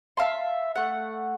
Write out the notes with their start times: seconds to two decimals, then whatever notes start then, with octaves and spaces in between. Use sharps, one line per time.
0.17 E5 F5 A5 C6
0.75 A3 F#5